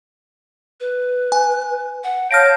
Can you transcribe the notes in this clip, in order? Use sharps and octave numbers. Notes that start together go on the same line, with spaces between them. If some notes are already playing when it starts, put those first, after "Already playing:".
B4
G#5
F#5
C#5 F5 A5 F6 G6 A#6 D7